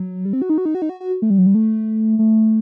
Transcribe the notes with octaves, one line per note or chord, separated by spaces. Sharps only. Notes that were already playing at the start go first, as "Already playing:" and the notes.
Already playing: F#3
G3
C4
F#4
D#4
F#4
D#4
F#4
D#4
F#4
F#4
A3
G3
F#3
G3
A3
A3